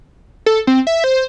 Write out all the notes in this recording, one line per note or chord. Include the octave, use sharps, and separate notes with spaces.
A4
C4
E5
C5